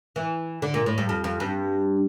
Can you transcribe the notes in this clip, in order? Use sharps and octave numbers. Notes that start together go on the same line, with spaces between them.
E3
D3
A#2
A2
G2
F2
F2
G2